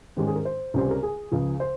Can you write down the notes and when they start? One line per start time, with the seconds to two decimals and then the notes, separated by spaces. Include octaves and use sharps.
0.17 G#2 D#3 G#3 C#4 G4
0.27 G#4
0.36 A#4
0.45 C5
0.74 C#2 C3 G3 C#4 C5
0.91 A#4
1.03 G#4
1.31 C#2 C#3 F3
1.60 C5